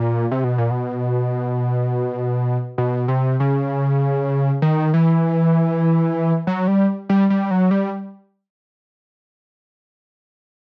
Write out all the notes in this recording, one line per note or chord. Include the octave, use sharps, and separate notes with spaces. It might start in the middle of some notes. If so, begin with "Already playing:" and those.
Already playing: A#2
C3
B2
A#2
B2
B2
C3
C#3
D#3
E3
F#3
G3
G3
G3
F#3
G3